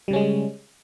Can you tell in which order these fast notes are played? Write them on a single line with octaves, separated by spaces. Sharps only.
G3 C#3 C#4 G#3